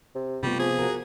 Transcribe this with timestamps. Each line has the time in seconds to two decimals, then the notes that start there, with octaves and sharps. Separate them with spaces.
0.15 C3
0.43 C3 G3 A3 B3 C4 F4
0.59 F3 G#4
0.79 F#4 A#4